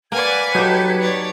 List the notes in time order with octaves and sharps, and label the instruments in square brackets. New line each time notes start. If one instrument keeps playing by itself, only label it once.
[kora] A#3 [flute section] B4 F#5 G#6 [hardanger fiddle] D5 G#5
[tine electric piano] F#3 [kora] D#4 G4 [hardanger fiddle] A4
[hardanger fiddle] C#5 D5